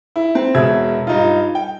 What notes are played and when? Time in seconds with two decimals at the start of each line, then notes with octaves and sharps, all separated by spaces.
0.16 E4
0.35 C4
0.55 E1 B2 E5 G#6
1.07 G2 D#4 F4
1.55 G5